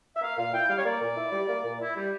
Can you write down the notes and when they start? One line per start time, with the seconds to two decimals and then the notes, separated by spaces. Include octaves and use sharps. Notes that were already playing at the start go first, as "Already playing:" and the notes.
0.17 E5
0.21 A#3 F5
0.37 A#2 F5
0.53 E4 G5
0.69 G3 F5
0.78 C#5
0.85 A#3 D5
1.02 A#2
1.17 E4
1.33 G3
1.49 A#3
1.65 A#2
1.81 E4
1.96 G3